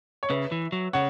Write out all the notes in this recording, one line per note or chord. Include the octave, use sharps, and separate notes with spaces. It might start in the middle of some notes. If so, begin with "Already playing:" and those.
C#5
C#3 B4 E5
E3
F#3
C#3 C#5 F#5